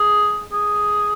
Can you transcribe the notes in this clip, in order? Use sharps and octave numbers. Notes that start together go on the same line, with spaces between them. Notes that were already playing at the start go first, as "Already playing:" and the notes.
Already playing: G#4
G#4